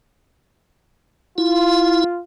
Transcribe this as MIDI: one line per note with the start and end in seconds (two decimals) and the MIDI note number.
1.38 2.04 64
1.38 2.19 65